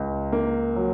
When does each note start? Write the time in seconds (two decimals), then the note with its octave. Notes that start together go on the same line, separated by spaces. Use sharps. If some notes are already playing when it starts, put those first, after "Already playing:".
Already playing: C#2
0.32 A#3
0.76 F#3